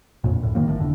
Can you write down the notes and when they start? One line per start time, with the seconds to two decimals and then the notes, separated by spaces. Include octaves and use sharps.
0.24 F2 A#2
0.42 C#2 A2
0.55 D3 D#3 F3 A#3
0.68 G1 A2
0.80 F1 D3